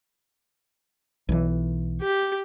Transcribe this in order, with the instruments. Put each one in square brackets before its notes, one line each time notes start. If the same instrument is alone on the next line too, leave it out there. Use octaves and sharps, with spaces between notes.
[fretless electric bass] B1 E3
[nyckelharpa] G4